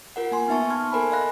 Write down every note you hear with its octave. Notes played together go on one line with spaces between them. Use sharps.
F4 A#4 F#5
A#3 G#5 C6
B3 D#4 E5 A5 C#6
C6 F6 G#6
A4 A#4 C5 G#5 B5
D#5 F5 B5 F#6 A#6